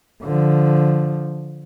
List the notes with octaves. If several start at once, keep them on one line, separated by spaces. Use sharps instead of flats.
D3 F3